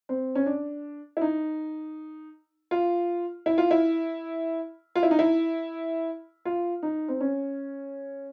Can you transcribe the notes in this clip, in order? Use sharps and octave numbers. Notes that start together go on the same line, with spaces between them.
C4
C#4
D4
E4
D#4
F4
E4
F4
E4
F4
E4
D#4
E4
F4
D#4
C4
C#4